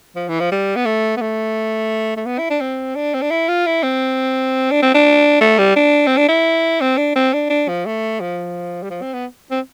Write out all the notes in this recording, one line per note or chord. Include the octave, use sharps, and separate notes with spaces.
F3
E3
F3
G3
B3
A3
B3
A3
A3
B3
E4
D4
C4
D4
C4
D4
E4
F4
E4
C4
D4
C4
D4
A3
G3
D4
C4
D4
E4
C4
D4
C4
D4
D4
F3
A3
F3
G3
F3
C4
B3
C4